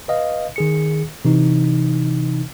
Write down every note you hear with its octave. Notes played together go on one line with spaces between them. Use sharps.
B4 D#5 F5
D#3 G#4 C#7
C3 E3 D#4